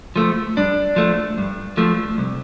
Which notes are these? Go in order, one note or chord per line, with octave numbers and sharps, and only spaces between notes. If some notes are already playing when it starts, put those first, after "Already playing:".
F3 A3
G2 D4
F3 A3
G2
F3 A3
C2